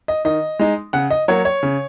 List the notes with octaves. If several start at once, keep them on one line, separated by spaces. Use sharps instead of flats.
D#5
D#3 D#5
G#3 D#4
C#3 F#5
D#5
F#3 A#3 C#5
C#5
C#3